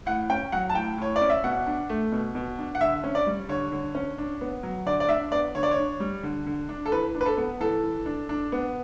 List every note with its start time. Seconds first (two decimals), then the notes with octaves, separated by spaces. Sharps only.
0.06 A2 F#5
0.30 C#4 G5
0.52 F#3 F#5
0.70 A5
0.75 A2 G5
0.98 A2 C#5
1.16 D5
1.21 C#4
1.30 E5
1.44 B2 F#5
1.66 D4
1.89 A3
2.12 B2
2.35 B2
2.58 D4
2.75 F#5
2.81 D3 E5
3.04 C#4
3.15 D5
3.26 G3
3.49 D3 C#5
3.72 D3
3.95 C#4
4.18 D4
4.41 B3
4.63 F#3
4.86 D3 D5
5.00 D5
5.09 D4 E5
5.32 B3 D5
5.55 D3 C#5
5.63 D5
5.71 C#5
5.78 D4
6.00 G3
6.23 D3
6.46 D3
6.69 D4
6.86 A4
6.92 E3 B4
7.15 D4
7.21 B4
7.26 A4
7.37 B3
7.60 E3 A4
7.83 E3
8.06 D4
8.29 D4
8.52 B3